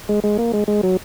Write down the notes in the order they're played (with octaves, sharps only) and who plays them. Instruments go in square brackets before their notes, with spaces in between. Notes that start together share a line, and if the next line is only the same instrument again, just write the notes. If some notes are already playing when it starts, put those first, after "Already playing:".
[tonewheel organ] G#3
G#3
A#3
G#3
G#3
F#3